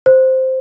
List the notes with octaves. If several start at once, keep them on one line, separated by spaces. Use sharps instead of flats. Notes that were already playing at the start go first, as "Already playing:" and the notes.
C5